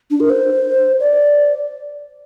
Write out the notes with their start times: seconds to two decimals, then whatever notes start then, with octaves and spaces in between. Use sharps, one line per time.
0.11 D4
0.20 A#4
0.30 C5
1.00 D5